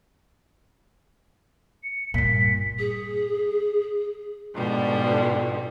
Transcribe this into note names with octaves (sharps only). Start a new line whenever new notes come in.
C#7
G2 A#2 B6
G#4
G#2 B2 D3 F3 G3